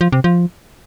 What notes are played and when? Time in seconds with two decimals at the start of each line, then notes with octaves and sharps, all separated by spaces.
0.01 F3
0.12 C3
0.24 F3